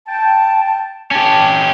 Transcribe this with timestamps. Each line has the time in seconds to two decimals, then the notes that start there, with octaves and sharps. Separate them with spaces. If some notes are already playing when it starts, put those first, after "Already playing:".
0.08 G5 A5
1.11 C#4 G4 A5